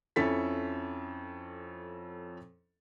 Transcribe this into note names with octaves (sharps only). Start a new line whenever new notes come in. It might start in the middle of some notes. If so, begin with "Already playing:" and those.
F2 C#4 E4 A4 A6 B6